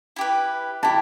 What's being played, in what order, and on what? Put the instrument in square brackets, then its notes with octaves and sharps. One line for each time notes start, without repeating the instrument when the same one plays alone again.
[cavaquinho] E4 G4 B4
[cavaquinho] E4 G4 [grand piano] A5